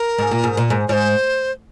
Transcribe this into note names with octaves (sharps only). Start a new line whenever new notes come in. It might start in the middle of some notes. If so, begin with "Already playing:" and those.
Already playing: A#4
G#2
A#2
G#2
A#2
G#2
G#2 C5 C#5